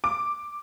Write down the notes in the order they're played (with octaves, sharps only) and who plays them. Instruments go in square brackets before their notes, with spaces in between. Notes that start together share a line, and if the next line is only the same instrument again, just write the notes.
[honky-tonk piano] D6